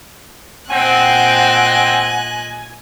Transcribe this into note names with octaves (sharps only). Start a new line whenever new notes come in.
A#2 C4 D#5 F#5 G#5 F#6